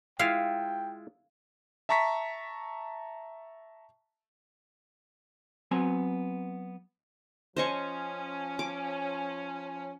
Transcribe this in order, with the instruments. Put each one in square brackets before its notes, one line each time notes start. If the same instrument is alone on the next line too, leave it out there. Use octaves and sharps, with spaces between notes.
[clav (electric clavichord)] G#3 E4 F4 [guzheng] F5 [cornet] G5
[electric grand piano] E5 A5 A#5 C#6 B6
[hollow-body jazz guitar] F#3 B3 C4 G#5
[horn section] F3 C#4 [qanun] C5 D#5 C#6
[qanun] D6